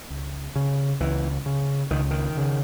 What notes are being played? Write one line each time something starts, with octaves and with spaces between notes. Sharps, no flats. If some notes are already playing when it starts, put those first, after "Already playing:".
C#2
C#3
C#2 E3
C#3
C#2 D#3
D#3
C#3